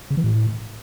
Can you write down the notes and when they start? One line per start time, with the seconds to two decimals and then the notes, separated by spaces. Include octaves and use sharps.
0.10 C#3
0.17 E3
0.24 A2